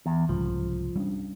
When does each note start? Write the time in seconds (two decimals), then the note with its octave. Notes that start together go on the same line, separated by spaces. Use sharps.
0.06 E2
0.29 C2 G#2 C#3 F3
0.96 G3 C#4 D4